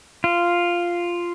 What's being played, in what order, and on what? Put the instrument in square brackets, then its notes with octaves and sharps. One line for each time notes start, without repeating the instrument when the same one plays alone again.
[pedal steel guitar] F4